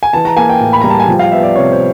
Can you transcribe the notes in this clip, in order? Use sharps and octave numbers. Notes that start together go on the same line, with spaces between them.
G#5
E3 A5
A#5
A#3 G#5
G5
A2
B5
G3 A#5
A5
G#5
F3 G5
F5
B3 E5
D5
C3 C#5
C5